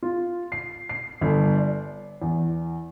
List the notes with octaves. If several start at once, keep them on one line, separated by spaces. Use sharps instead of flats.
F4
C7
C7
G1
D5
E2